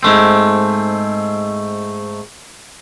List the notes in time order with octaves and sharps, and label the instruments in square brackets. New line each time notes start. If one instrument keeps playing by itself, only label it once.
[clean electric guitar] G#2 A3 C4